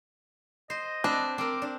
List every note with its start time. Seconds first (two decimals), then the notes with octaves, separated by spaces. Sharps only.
0.70 C5 D#5
1.04 C4 D4 B4 C5
1.38 C4 A#4 D6
1.62 D4